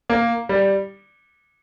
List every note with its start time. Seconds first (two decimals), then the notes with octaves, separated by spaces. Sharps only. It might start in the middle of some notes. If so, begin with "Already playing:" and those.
0.10 A#3
0.49 G3